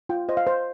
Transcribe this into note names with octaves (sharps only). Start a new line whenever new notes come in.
F4 G5
C5 D#5
F5
C5